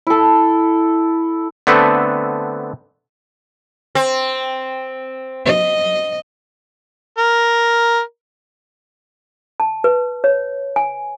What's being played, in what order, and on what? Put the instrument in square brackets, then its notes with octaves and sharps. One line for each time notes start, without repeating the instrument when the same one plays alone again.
[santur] E4 A4
[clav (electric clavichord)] D3 A3 B3 C4 A4 B4
[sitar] C4
[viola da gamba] D#5
[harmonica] A#4
[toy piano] A5
B4
C#5
G#5